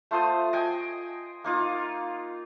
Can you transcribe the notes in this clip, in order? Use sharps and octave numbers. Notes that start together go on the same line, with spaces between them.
A3 F4 C5 D#6
D#5 G5 G#5
A#3 D#4 F4